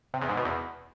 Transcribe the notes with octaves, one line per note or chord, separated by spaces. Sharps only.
C3
E2
G#2
B2
E2